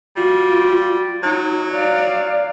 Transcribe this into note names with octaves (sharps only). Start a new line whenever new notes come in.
G3 F4 F#4
F#3 D#4
D5 F5